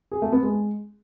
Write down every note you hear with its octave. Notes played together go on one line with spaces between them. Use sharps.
G#4
A3
B3
G#3